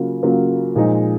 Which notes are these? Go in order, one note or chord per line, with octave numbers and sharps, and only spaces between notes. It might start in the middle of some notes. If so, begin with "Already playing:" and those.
Already playing: C#3 F#3 A#3 F4
C#3 F#3 A#3 F4
A#2 F3 G#3 D#4